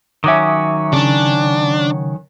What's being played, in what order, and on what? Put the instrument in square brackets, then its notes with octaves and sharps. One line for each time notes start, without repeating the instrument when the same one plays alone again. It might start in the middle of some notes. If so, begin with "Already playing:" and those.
[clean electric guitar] D#3 F#3 C#4 [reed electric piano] E5 D6 D#6
[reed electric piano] C#3 [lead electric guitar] D4